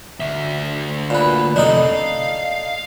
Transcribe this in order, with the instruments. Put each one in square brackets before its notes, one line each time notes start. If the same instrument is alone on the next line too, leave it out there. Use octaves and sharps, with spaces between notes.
[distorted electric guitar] D2 E5
[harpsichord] A#2 B4
[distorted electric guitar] F2 C3 [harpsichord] D4 D#4 A4
[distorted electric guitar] F5